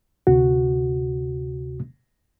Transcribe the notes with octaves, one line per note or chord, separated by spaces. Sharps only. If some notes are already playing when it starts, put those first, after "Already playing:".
D2 C3 F#4